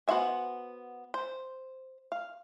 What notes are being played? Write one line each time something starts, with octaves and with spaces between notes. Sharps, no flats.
B3 F#4 C5 E5 G#5
C5
F5